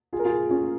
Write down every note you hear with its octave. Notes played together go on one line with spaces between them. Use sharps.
F4 G#4
A#4
F4 G#4
C#4 F4